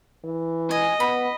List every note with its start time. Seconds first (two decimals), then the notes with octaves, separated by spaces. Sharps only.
0.24 E3
0.71 D#5 G#5
1.00 B3 B5